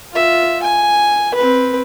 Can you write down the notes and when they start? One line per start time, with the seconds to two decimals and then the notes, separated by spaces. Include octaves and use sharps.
0.13 F4 E5
0.63 G#5
1.34 C4 B4